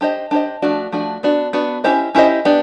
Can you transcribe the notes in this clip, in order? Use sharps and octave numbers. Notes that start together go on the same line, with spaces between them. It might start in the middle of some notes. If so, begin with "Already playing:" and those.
D4 G4 C5 D#5
D4 G4 C5 D#5
F3 A3 D4 F#4
F3 A3 D4 F#4
B3 D4 F#4
B3 D4 F#4
C#4 E4 G4 C5 D#5
C#4 E4 G4 C5 D#5
B3 D4 G4